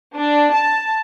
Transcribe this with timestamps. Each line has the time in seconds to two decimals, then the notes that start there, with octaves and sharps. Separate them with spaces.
0.16 D4
0.54 A5